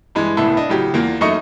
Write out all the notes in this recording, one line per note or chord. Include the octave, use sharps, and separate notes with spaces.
G2 E3 G#3
C2 A2 B3 E5 A5
D4 D#5
A2 C#3 F#3 G4
E2 A#3 F4
F#2 A3 D#4 D#5 C#6 C#7